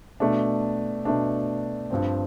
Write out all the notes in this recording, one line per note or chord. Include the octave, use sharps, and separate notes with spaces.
B2 A3 D4
B2 A3 D4
G2 F3 C4